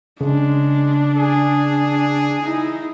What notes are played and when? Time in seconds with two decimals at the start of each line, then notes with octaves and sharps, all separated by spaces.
0.21 C#3 G#3 D4
1.18 G#4
2.42 D#4 E4